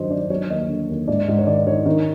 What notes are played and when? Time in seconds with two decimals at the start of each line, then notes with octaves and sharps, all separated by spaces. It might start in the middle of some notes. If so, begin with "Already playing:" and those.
Already playing: G2 D#3 F#3 C5 D#5
0.10 D#3 D5
0.30 F#3 C#5
0.49 D#2 D#5
0.69 D3
0.89 D#2
1.08 G#2 D5
1.28 G#2
1.39 C#5
1.47 D#3 D5
1.67 D#3 C#5
1.86 D#3